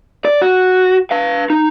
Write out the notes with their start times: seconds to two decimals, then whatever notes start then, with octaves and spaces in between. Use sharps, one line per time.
0.25 D5
0.42 F#4
1.11 B4 F5
1.50 D#4